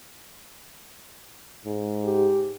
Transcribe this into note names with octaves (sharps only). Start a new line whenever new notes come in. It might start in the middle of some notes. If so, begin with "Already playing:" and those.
G#2
G4